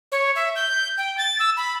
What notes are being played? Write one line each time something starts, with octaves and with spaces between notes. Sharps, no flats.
C#5
E5
G6
G5
A6
E6
B5